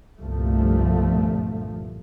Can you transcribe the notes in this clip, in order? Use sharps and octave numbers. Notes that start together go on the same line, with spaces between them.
G1 C2 G2 A#2 F3 A3